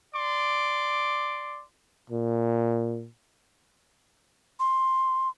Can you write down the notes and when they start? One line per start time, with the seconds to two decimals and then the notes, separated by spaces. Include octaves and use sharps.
0.15 D5 C6 D6
2.10 A#2
4.60 C6